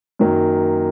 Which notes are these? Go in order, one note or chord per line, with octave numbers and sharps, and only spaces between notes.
F#2 D#3 F#3 A#3